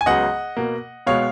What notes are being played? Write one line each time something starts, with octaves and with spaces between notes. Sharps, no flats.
G#5
C#2 C#3 F#3 B3 D#5 F#5
B2 A#3
B2 G#3 B3 C#5 F5